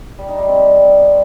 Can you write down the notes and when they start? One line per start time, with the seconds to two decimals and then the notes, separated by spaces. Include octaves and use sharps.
0.19 G3
0.29 D#4
0.39 G3
0.49 C4